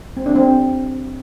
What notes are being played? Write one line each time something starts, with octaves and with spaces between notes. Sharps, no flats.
C4
D4
C4